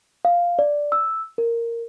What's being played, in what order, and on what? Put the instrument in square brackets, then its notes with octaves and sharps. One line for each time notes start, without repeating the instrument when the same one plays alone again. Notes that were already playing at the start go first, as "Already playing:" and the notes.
[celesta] F5
D5
E6
A#4